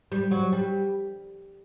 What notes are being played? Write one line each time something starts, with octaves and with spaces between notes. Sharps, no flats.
G3
F#3
G3